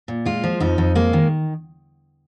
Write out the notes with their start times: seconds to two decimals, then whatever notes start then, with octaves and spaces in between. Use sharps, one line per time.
0.08 A#2
0.25 G#3 F4
0.43 F3
0.60 F2 D#4
0.78 F2
0.95 G#3 A#3
1.13 D#3